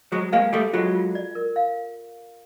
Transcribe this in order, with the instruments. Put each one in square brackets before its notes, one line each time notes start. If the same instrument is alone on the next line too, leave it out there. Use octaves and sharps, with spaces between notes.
[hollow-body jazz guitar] F#3 G#3 [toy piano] C5
[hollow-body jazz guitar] G#3 A#3 [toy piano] F5
[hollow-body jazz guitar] G3 A3 [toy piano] A4
[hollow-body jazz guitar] F#3 G#3 [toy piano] F4
[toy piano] F4
D5
A#4
F5